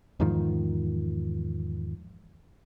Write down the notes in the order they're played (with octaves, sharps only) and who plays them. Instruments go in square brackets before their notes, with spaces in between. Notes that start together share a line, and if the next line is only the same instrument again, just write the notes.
[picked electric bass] E2 G#2 D#3 F3